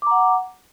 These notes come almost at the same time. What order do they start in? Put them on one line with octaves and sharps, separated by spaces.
D6 A#5 F#5